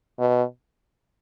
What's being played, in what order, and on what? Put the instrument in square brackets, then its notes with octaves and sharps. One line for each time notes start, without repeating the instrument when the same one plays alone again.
[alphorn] B2